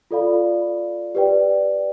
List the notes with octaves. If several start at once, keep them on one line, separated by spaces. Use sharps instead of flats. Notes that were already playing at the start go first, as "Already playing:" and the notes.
F4 A4 D5 F5 B5
G4 B4 D5 G5